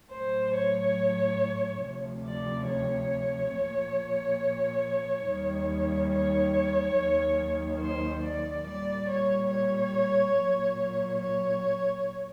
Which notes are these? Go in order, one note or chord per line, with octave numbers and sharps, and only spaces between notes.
A2 F#3 C5
C#5
D2 C3 F3
D5
C#5
A#2 F3
D#2 D#3 G3
C#5
D#2 D#3 F#3
C5
D5
A#2 G3 D5
C#5
C#5
A#2 F#3
C#5